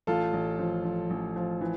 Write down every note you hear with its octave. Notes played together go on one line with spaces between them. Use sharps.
A1 F4 A4
A1
F3
F3
A1
F3
E3